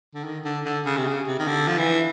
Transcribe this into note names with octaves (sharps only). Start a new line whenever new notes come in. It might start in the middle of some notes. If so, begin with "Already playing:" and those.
D3
D#3
D3
D3
C#3
C3
C#3
C3
D#3
D3
F3
E3